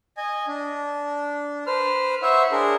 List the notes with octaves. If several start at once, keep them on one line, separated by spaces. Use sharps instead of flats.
D#5 G#5
D4
B4 C5 F6
E4 C5 C#5 E5 F#5
D4 G#4 A#4